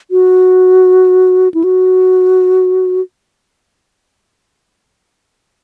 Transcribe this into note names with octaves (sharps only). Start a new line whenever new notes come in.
F#4
E4
F#4